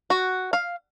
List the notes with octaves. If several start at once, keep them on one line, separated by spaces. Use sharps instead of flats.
F#4
F5